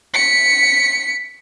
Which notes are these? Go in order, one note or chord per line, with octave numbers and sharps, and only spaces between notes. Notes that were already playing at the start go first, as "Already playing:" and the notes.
B6 C#7